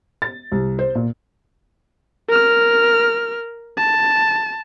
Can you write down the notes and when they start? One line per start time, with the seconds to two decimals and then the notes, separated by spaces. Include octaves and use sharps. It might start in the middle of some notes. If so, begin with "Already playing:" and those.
0.22 A6
0.52 C2
0.79 C5
0.95 A#2
2.29 A#4 F6
3.77 A5